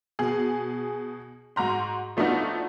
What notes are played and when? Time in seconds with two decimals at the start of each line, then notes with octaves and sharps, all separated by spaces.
0.19 B2 G#4
1.56 G#2 F#4 A#5 C6
2.17 F3 A3 B3 D4 D#4 F#4